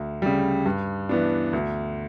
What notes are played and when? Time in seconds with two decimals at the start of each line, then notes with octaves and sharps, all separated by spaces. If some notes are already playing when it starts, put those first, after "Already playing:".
Already playing: D2
0.22 C#3 G3
0.66 G2
1.09 E3 B3 D4
1.53 D2